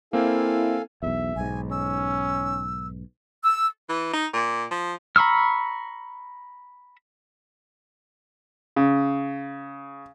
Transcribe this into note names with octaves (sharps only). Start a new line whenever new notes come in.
A#3 C4 E4 A4 F5 G#5
B1 E2 E5
B1 G#2 G#5
C#4 E6
E6
E3
D#4
A#2
F3
A#5 B5 C#6 E6 F6
C#3